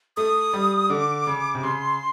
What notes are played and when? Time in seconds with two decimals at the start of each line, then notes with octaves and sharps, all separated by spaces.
0.17 A3 D#6
0.53 G3
0.90 D3 D6
1.27 C#3
1.54 C3
1.63 C#3 C6